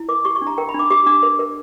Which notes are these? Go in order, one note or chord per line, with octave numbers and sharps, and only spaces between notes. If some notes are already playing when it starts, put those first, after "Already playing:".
Already playing: E4
A#4 D6
G4 C#6
C#6
D4
A#5
A#4 G5
B5
D4 D6
G4 D6
D4 D6
A#4
A#4